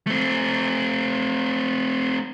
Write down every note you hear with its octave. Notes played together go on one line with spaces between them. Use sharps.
A3 C4